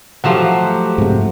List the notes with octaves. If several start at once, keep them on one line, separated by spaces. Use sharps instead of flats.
F3 F#3 A3 F#4 G4 F#5
G#2 C3